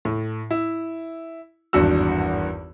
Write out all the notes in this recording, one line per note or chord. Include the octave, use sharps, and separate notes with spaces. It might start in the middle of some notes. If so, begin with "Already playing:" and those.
A2
E4
G#1 E2 G2 F#4 E6